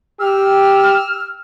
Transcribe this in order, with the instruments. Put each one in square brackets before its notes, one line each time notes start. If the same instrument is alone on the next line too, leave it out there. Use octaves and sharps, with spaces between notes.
[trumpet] G4 [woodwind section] E6 F6